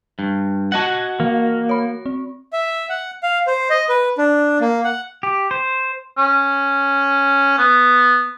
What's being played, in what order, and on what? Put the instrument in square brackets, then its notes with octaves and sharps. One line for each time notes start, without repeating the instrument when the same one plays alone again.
[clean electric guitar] G2
[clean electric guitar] F#4 D#5 F#5 [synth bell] A5 G#6
[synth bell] E3 [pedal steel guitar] A#3
[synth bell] C#5 B5
C4
[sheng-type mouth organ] E5
F#5
F5
C5
D#5
B4
D4
A#3
F#5
[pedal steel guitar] G4
C5
[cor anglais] C#4
B3